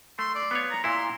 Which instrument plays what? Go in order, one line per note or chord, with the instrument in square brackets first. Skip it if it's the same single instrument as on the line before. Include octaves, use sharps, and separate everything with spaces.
[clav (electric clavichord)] A3 [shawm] C6
[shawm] D5
[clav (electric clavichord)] B3 F4 C#5
[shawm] A#5
[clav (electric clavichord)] A#2 E4 [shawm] C6